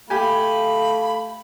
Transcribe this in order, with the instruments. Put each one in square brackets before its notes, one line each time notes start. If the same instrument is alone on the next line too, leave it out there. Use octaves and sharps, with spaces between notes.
[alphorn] A3 [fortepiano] G4 G#5 [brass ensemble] F5 [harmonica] B5